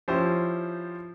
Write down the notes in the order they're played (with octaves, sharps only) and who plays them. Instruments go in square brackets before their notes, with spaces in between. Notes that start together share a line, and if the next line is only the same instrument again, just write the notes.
[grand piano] F3 C#4 E4 G4 C5